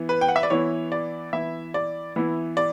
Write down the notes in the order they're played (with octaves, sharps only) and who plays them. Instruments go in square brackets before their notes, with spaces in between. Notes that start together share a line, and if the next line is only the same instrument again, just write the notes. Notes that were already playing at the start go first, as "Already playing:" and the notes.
Already playing: [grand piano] E3 B3 E4
B4
G5
F#5
E5
D5
E3 B3 E4 C#5
D5
E3 B3 E4 E5
D5
E3 B3 E4
D5